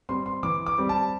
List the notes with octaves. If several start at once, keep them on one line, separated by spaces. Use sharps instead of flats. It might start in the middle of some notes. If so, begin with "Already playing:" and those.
G3 C4 C6
C6
E3 D6
D6
G3 C4
A5